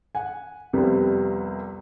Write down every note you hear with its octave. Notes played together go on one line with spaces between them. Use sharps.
F#5 G#5
C2 F2 C3 G3 B3